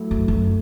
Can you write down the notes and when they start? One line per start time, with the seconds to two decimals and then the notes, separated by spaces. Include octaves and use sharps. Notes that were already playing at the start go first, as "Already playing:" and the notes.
Already playing: A2 F#3 A3 E4
0.11 F#2
0.28 F#2